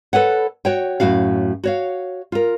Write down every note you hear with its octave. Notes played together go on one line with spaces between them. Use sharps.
A4 B4 C#5 F#5
F#4 C#5 G5
F#2 A2 F#4 F5
F#4 C#5 F5
F4 A#4